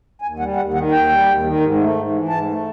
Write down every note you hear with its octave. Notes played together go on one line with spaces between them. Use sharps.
D#2 G#5
G3 F#5
D#2 F#5
D#3 F#5
D#2 G5
G3
D#2
D#3
G#2
A3
G#2
E3
G#2 A5
A3